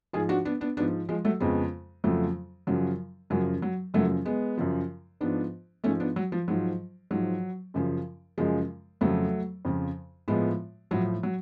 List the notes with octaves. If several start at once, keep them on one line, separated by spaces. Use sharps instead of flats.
G#2 F3 F4 G#4
D4 F#4
B3 D4
B3 D4
G#2 F3 B3 D4
F3 G#3
F#3 A3
F2 C#3 F3 G#3 B3
F2 C#3 F3 F#3 A3
F#2 C#3 F3 F#3
F#2 C#3 F3 F#3
F#3
F#2 C#3 F3 F#3 A3
G#3 B3
F#2 C#3 F3
G#2 F3 B3 D4
G#2 F3 A3 C#4
B3 D4
F#3
F3
G#2 F3 F#3
G#2 F3 F#3
F#2 C#3 F3
F#2 C#3 F3 G#3
F2 C#3 F3 F#3 A3
F2 C#3 F3
A2 F3 G#3 B3
A2 F3 F#3
F#3